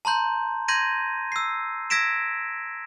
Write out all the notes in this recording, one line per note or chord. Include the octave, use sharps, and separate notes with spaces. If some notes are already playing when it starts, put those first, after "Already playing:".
A5 A#5 C6 G6
C6 G6 G#6 A#6 D#7
E6 C7
E6 G#6 A#6 B6 D7 E7